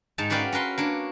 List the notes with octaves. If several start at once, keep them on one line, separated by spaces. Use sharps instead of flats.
G#2 D#4 A5
C#4 F#4 B4 D5 F5 G5
C#4 A#4 B4 C6
A#3 D4 C#5